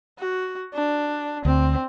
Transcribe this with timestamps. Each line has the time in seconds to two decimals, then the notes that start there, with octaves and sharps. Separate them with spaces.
0.19 F#4
0.73 D4
1.45 D2 C4